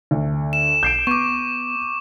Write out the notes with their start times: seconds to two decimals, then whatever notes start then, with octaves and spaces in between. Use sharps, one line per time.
0.11 D2
0.53 E7
0.83 B1 G6 C7 D7
1.07 B3 C#6 D6